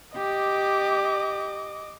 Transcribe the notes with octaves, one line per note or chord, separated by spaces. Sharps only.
G4 D#5 D6